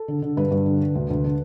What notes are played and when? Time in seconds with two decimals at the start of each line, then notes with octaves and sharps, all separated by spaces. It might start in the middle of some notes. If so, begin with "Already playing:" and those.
Already playing: A4
0.08 D3
0.22 D3
0.37 G2 B4
0.51 G2
0.66 D3
0.80 D3
0.95 D2
1.10 D2
1.24 D3